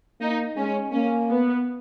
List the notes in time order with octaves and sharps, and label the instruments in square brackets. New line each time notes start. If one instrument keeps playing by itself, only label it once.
[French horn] A#3 [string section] D#4
[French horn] G#3 [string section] C#4
[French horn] A#3 [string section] C#4
[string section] B3